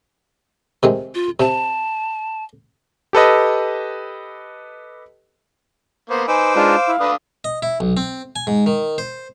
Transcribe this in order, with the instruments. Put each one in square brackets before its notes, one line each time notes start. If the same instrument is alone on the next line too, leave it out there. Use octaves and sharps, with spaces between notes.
[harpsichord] C3 D#3 G#3
[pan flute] F4
[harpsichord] C3 [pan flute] A5
[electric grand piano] G4 A4 B4 D#5
[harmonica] A#3 B3 [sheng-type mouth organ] C5
[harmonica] D#4 B4 [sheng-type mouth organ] C5 D6 E6 [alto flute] G#5
[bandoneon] G#3 D4 F4 [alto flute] F5
[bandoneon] E4
[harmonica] D3 D4 D#6 [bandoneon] B4
[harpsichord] D#5
E4
B1
C4
G#5
G#2
D#3
C5